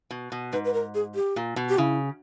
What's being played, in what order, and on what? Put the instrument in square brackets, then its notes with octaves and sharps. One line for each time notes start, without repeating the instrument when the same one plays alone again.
[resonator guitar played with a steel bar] B2
B2
[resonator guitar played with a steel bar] G#2 [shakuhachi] B4
[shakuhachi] B4
A#4
G#4
G4
[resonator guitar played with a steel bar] A#2
B2
[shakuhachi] G4
[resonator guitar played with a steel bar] C#3 [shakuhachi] E4